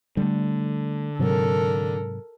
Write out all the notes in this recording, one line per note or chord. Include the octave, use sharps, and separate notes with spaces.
D3 G3 A3
G#2 C3 F#3 A4 A#4